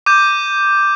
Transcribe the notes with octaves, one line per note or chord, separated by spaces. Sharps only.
D6 G6 D#7